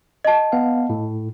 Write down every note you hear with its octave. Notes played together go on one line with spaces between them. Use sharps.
D#5 A5
B3 F5
A2